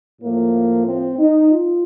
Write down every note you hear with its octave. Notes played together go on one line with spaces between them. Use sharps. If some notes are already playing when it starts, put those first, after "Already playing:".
A2 F3 A#3
C4
D#4
F4